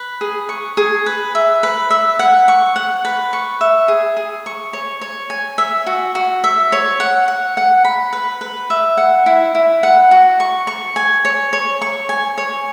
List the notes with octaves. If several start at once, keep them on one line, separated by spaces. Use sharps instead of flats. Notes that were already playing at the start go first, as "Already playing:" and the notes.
Already playing: B4
G#4
C#6
G#4
B4
E5
B4
E5
F#5
C#6
F#5
B4
C#6
E5
G#4
G#4
C#6
C#5
C#5
G#5
E5
F#4
F#4
E5
C#5
F#5
F#5
F#5
B5
B4
B4
E5
F#5
E4
E4
F#5
F#4
C#6
C#6
G#5
C#5
C#5
C#6
G#5
C#5